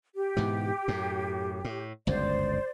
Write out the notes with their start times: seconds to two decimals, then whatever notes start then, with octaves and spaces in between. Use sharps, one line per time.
0.15 G4
0.37 G#2 B2 E3
0.88 F#2 A2
1.65 A2
2.07 G1 C#2 F#2 C5 D5